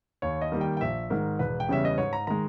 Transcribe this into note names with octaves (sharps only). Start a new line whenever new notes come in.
D#2 C#5
D#5
D#3 G3 A#3
G5
G5
A#1 E5
G#2 D#3 G#3 A#4
E1 B4
G5
E2 C#3 G3 C#4 E5
D#5
G#2 C#5
A#5
D#3 G#3 A#5